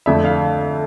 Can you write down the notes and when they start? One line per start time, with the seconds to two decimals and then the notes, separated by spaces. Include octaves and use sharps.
0.06 F2 D3 A3 E5
0.25 F5